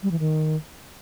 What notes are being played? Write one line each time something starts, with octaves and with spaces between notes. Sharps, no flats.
G3
E3
D#3